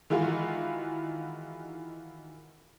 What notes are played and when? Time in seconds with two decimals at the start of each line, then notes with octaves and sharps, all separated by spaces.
0.10 D#3 E3 G#3 F4 F#4